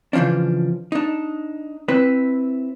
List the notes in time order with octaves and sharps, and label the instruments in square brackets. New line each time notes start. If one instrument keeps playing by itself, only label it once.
[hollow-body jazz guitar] C#3 E3 F3 C#4 D4
D4 D#4
C4 E4 B4